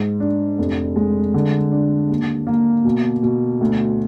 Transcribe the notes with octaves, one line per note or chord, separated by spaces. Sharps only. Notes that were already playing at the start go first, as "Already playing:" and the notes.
Already playing: G#2
D4
F1
G#3
D3
D4
D#2
A#3
B2
B2
D2